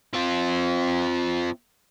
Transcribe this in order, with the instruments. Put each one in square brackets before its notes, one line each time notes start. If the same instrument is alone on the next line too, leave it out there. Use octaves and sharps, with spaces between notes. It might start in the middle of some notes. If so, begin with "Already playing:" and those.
[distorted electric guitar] C4 F4